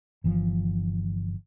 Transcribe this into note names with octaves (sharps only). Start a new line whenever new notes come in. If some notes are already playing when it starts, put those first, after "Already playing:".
G1 E3 F3